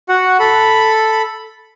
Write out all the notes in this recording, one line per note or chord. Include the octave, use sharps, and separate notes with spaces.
F#4 F#5
A4 B5